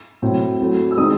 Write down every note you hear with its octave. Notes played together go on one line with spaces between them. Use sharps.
A2 F#3 C4 E4
F#3 A3 C4 E4
E6
D#3 G#3 C4 D#4 D#6